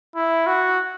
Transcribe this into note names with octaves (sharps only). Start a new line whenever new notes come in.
E4
F#4